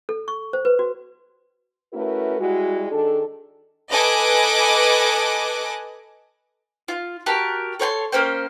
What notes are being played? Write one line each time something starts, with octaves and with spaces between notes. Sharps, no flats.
A4
C#6
C5
B4
F#4
A3 C#4 E4 F#4 A#4 B4
G3 G#3 E4 F#4
D#3 D4 G#4 A4
A4 B4 D#5 G#5 D6 F#6
F4
F#4 G4 A#4 A5
A4 C#5 G5 C6
A#3 C#4 C5 G5